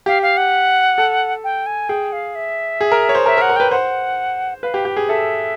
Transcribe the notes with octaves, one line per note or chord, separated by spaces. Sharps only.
G4 F5
F5
F#5
A4
G5
G#5
G#4 G5
F5
E5
G#4
A#4
C#5
C5
A#4 E5
A#4
F#5
A#4
B4 G5
C5 F#5
B4 F5
G4
G4
G#4
A4 E5